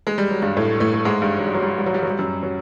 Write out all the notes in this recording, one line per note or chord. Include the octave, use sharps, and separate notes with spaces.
G#3
G3
F#3
G2 G3
A2 A3
A2 A3
A3
G#2 G#3
G2 G3
F#3
G3
F#3
G3
F#3
G3
F#3
G3
F#3
G3
F#2 F#3
F#3